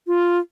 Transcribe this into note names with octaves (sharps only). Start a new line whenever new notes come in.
F4